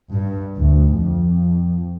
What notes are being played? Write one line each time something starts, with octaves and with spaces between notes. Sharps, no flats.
G2
D2
F2